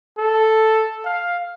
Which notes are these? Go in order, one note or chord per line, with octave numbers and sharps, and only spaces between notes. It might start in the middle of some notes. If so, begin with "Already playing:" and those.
A4
F5